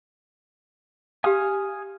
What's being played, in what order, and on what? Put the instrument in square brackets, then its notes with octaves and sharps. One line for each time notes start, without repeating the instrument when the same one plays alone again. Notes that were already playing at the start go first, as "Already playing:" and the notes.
[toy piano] G4 F5 [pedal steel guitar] G#5 D#6 F6